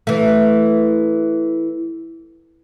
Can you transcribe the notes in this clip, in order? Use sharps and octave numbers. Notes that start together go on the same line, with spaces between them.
E3 A3